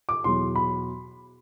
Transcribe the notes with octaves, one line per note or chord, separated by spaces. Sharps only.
D6
E2 B2 F#3 C6
B5